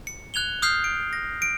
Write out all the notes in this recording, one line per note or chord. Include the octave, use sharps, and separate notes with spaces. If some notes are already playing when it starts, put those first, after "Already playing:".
C#7
F#6 G#6 F7 G7
D#6 F6 G6 C7
D7
A#6
D7